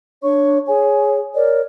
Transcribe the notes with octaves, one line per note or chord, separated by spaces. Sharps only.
D4 C#5 C#6
G#4 C#5 G#5
A#4 C#5 D5